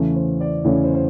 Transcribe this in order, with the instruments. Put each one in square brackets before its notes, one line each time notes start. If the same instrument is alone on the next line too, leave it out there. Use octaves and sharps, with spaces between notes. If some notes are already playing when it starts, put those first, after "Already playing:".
Already playing: [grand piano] E2 C#3 E3 A3 C#4
C5
D5
E2 C#3 E3 A3 C#4 C#5
C5
C5